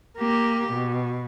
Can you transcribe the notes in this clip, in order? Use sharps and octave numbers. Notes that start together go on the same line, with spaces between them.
A#3 G4
B2